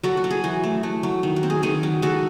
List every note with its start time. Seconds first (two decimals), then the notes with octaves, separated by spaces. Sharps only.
0.03 F#3 F#4 A4
0.17 F#4
0.24 F#3
0.31 G#4
0.44 E3 F#4
0.63 A3
0.83 A3
1.03 F#3
1.23 D#3
1.36 F#4
1.43 C4
1.50 G#4
1.63 D#3 G#4
1.83 F#3
2.02 G#3 F#4 A4